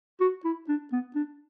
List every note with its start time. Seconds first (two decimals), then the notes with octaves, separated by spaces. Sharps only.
0.21 F#4
0.45 E4
0.69 D4
0.93 B3
1.15 D4